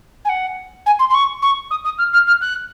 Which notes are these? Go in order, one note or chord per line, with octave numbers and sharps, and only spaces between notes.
G#5
F#5
G#5
C6
C6
C#6
C#6
D#6
D#6
F6
F6
F6
F#6